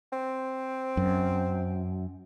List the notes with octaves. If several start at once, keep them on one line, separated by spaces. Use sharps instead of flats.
C4
F#2